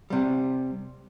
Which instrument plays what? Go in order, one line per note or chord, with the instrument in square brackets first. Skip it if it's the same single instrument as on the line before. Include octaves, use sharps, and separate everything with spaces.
[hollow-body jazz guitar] C3 G3